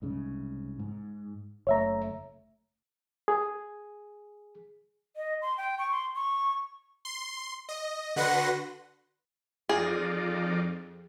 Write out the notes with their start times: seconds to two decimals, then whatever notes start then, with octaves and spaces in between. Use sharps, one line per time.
0.02 C2 G#2 C#3
0.79 G#2
1.67 F#1 A3 C#5 E5 A#5
3.28 G#4
5.16 D#5
5.42 C6
5.58 G5
5.79 C#6
5.92 C6
6.15 C#6
7.05 C6
7.69 D#5
8.16 D3 F#4 B4 F#5 C6 A#6
9.69 F2 D#4 F4 G#4 D5